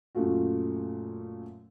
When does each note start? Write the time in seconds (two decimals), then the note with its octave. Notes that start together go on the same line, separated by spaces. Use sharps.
0.15 F#2 A#2 A3 F4 F#4